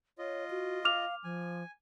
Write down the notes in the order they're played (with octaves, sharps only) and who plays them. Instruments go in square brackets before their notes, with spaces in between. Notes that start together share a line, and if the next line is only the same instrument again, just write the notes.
[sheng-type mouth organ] F4 D#5 [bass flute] C#5
[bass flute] F#4
[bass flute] F5 [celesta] D6 F6 F7
[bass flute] F3 [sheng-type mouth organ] G#5